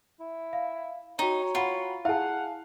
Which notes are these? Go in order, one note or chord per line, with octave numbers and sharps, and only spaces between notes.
E4
F5
D#4 F#4 C#5 G5 A#5
F4 F#5 B5
E4 G#4 F5 F#5 A5